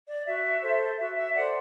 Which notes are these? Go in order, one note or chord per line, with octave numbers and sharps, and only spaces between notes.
D5
F#4 E5
A4 C5
F#4 E5
E5
A4 C5 D5 F#5